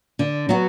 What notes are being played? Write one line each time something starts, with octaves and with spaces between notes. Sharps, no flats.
D3
F#3 B3 F#4